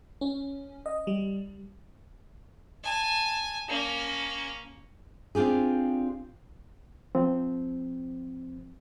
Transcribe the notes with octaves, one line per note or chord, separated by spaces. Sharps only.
C#4
D#5
G3
G#5 A5
A#3 C#4
C4 D4 F4 G4 G#4
F3 C4